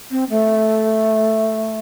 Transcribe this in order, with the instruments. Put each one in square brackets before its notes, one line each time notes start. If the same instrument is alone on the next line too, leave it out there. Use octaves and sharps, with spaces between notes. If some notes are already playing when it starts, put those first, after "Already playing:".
[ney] C4
A3